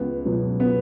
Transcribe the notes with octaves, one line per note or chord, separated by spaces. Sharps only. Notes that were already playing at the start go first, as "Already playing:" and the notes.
Already playing: C#2 B3
B2 F#3
B3